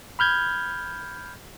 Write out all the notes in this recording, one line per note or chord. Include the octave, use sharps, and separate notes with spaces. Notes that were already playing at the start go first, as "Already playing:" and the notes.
B5 F6 G6 G#6